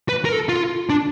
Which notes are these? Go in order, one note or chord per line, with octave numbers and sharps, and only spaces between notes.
B4
A#4
A4
F4
D4